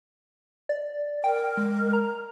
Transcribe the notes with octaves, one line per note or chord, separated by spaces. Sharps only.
D5
A#4 G5
G#3
A#5